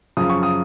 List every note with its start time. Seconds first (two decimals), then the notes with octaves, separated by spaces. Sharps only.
0.17 F#2 C#3 F3 D#6
0.30 C#6
0.43 D#6